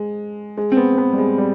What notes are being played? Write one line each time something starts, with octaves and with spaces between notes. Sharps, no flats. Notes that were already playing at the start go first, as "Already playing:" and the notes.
Already playing: G#3
G#3
C4
B3
C4
B3
G3
G#3
G3